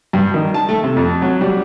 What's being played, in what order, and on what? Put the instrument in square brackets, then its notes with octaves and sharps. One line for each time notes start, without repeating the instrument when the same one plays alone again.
[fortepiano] G2
D#3
A5
A3
C3
F2
F#3
G3